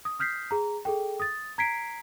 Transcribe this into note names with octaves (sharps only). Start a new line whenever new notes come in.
D#6
D#6 F6 G6 B6 C7
G#4 A#5
G#4 A4 G5
D#6 A6
A#5 G#6 B6 C7 D7